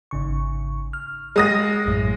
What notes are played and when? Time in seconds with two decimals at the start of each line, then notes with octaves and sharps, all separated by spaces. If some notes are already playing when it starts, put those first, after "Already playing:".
0.11 G#1 C#3 C#6
0.93 F6
1.36 G#3 D#6 A#6
1.86 A1 F#2 A2